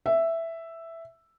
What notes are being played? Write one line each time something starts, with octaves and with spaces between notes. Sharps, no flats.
E5